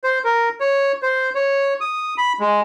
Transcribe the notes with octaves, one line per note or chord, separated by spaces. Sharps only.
C5
A#4
C#5
C5
C#5
D#6
B5
G#3